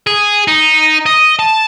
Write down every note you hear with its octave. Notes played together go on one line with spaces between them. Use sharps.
G#4
D#4
D#5
A5